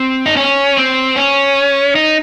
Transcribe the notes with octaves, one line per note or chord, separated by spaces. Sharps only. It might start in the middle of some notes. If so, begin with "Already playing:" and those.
Already playing: C4
D#4
C#4
C4
C#4
D#4